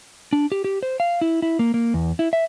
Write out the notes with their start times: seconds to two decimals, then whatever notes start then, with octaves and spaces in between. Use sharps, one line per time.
0.33 D4
0.52 G4
0.64 G4
0.83 C5
1.00 F5
1.21 E4
1.42 E4
1.59 A#3
1.74 A#3
1.94 E2
2.19 E4
2.33 E5